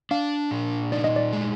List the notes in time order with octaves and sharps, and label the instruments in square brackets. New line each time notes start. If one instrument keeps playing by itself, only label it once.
[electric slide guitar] D4 [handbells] F5
[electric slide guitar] A#2
[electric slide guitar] D#4 [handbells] D5
[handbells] D#5
D5
[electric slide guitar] G#3